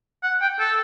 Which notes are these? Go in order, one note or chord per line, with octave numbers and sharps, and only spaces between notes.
F#5
G5
A4